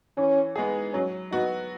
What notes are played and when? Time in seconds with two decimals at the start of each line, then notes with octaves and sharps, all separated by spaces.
0.17 E3 C#4
0.56 G#3 B3 D#4 G#4
0.93 F#3 C#4
1.32 B3 D#4 F#4